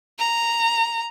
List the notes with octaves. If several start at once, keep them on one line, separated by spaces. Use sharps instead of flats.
A#5